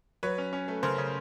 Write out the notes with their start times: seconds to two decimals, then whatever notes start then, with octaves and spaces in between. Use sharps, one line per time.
0.23 F#3 B4 C#5
0.38 C#4
0.53 C#4
0.68 A3
0.83 C#3 A#4 C5
0.98 C#3